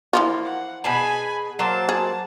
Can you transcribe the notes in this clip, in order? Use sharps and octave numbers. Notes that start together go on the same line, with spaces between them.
E3 F3 A#3 F4
F#5
B2 G#4 G#5 A5 B5
F#3 A#3 C5 A5
G#4